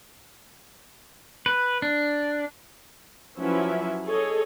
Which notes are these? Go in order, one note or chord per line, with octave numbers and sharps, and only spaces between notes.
B4
D4
F3 F#3 C#4 E4 B4 E5
G#4 A4 C#5 D#5